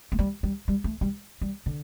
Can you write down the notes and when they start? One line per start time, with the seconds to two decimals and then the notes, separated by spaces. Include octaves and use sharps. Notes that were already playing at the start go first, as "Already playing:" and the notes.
0.12 A3
0.19 G3
0.43 G3
0.68 G3
0.84 A3
1.01 G3
1.41 G3
1.66 D3